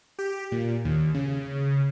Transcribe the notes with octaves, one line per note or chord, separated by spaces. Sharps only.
G4
A#2
D#2
C#3